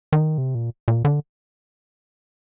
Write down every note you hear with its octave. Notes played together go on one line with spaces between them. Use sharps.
D#3
C3
A#2
A#2
D3